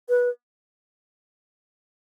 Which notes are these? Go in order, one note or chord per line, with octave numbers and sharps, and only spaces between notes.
B4